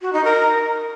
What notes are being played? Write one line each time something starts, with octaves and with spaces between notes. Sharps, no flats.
F#4
D#4
A#4